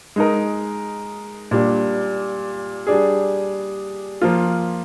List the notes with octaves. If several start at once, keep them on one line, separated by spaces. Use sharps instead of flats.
G#3 D#4 A#4
A#2 G3 D4
G3 D4 G#4
F3 A#3 F4